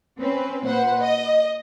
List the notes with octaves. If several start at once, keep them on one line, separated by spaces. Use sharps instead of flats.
C4 C#4 B4
A#2 B4 C5 F#5
D#5